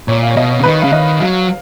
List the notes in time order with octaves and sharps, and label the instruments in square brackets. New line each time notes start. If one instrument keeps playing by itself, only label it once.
[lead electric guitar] A#2 [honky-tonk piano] C#5
[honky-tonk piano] F5
C#5
[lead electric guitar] B2 [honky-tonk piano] D#5
[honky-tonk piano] C#5
[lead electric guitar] C#3
[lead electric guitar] D#3 [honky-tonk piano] B4
[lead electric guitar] C#3 [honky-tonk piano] F5
[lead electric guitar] D#3 [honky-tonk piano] D#5
[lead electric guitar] F#3 [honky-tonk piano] F5